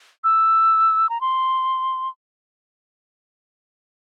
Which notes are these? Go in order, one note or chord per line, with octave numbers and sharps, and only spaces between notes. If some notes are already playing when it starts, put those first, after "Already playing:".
E6
A#5
C6